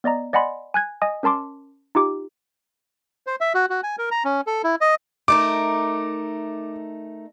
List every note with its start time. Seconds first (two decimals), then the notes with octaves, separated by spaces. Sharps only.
0.04 B3 D5 D#5 A#5
0.33 D5 D#5 F#5 G#5 B5 C6
0.74 G#5 F#6 G#6
1.02 D#5 G#5 D#6
1.23 C#4 A#4 A5 C6 D6
1.95 D#4 F4 G4 D6
3.27 C5
3.41 E5
3.55 F#4
3.70 F#4
3.83 G#5
3.98 A#4
4.11 A#5
4.25 C#4
4.47 A4
4.64 E4
4.81 D#5
5.28 A3 D#4 A#4 D6